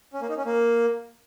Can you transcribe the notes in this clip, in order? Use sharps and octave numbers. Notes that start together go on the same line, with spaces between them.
C#4
A#3
D#4
C#4
A#3